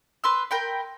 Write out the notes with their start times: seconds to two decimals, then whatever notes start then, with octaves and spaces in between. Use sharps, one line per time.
0.24 B4 C6 E6
0.51 A#4 G5 B5